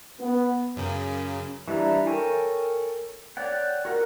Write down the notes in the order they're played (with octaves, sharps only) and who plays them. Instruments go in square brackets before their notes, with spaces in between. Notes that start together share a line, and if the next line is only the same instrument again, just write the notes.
[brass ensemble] B3
[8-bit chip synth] F#2 C#3
[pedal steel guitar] E3 G3 D4 E4 A#5
A4 A#4 C#5 G5 G#5
C#5 D5 F#5 G5
F#4 A#4 F#5